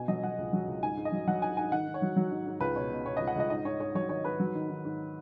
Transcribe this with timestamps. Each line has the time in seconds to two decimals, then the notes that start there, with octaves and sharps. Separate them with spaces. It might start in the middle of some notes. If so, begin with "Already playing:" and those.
Already playing: B2 G#5
0.08 F#3 D#5
0.23 F#3 F#5
0.38 C#2
0.53 F#3
0.68 C#2
0.83 G#2 G#5
0.97 G#2
1.05 D#5
1.12 F#3
1.27 F#3 F#5
1.42 G#2 G#5
1.57 G#2 G#5
1.72 D#3 F#5
1.87 G#2
1.94 C#5
2.02 F#3
2.16 F#3
2.31 G#2
2.46 G#2
2.61 C#2 B4
2.76 B2 C#5
2.91 B2
3.05 B2 C#5
3.17 D#5
3.20 C#2
3.27 F#5
3.36 C#2 D#5
3.50 G#2 D#5
3.65 G#2 C#5
3.80 G#2 C#5
3.95 F#3 C#5
4.09 D#3 C#5
4.25 G#2 B4
4.40 F#3
4.55 D#3
4.69 D#3
4.85 G#2